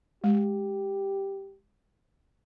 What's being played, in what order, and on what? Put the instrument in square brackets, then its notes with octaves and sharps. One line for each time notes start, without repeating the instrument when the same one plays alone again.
[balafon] G#3 [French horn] G4